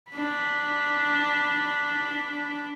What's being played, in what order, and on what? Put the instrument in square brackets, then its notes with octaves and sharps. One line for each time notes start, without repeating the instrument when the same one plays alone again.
[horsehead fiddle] D4 B5